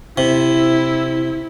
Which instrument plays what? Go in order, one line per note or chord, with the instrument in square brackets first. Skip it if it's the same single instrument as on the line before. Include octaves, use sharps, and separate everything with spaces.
[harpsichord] C3 [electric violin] E4